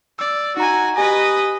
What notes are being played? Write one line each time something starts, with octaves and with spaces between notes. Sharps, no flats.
D5 E6
D#4 F#4 G#5 A#5
G4 B4 D#5 G#5 A#6